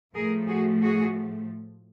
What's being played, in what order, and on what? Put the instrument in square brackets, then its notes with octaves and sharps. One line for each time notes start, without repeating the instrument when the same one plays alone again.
[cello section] A2 F3 A3 G#4 A#4
F#4 G#4
F#4 G#4